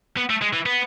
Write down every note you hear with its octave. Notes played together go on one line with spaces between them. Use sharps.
B3
A3
G#3
E3
B3